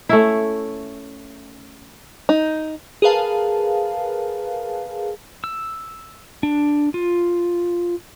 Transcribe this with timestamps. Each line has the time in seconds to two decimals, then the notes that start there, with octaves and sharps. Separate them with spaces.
0.09 A3 C#4 E4
2.29 D#4
3.02 G#4 A#4 B4 F5 A5
5.44 E6
6.43 D4
6.94 F4